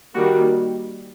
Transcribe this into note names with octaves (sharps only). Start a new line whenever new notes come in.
D#3 G3 A#3 F#4